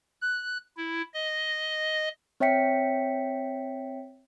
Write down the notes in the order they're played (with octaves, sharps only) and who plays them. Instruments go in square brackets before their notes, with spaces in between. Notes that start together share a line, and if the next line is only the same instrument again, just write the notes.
[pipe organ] F#6
E4
D#5
[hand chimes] C4 C#5 E5 G5 B6 C#7